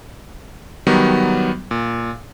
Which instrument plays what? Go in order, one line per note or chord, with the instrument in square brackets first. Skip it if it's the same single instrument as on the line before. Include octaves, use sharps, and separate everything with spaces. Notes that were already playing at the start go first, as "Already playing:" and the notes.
[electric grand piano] D#3 F#3 G3 B3
A#2